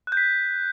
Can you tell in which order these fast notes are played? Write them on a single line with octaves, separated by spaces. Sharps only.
F#6 G6 B6